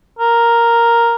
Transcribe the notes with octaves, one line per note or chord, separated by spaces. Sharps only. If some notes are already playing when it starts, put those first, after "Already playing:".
A#4